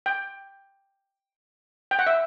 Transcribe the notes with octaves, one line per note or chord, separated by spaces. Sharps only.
G5
G5
F#5
E5